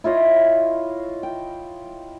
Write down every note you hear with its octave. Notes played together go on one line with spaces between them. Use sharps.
E4 F4 C#5 D#5
G5